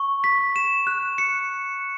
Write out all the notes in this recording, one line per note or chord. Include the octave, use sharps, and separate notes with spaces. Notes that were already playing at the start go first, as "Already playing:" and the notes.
Already playing: C#6
B6
E7
F#6
C#7